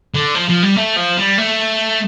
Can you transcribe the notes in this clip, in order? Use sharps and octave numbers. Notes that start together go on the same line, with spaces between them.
D3
F3
F3
G3
A3
F3
G3
A3